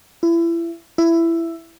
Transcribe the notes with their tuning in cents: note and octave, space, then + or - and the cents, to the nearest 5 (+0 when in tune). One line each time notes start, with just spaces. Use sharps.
E4 +30
E4 +15